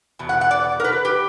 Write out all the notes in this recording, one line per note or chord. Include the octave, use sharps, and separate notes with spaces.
E2 B2
F#5
F#5
D5
A#4
B4
G4